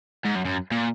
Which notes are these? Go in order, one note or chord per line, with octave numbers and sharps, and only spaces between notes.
G#2
F#2
F#2
A#2